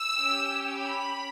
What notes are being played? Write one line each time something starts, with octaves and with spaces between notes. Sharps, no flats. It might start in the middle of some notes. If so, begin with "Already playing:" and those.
Already playing: E6
C#4 G4
B5